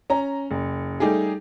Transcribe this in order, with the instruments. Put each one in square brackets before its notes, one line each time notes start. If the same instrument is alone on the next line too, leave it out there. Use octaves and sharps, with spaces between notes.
[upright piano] C#4 A#5
F#1
G3 A3 D#4 G4 G#4